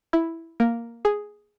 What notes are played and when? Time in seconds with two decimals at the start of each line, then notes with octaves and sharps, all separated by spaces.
0.13 E4
0.60 A#3
1.05 G#4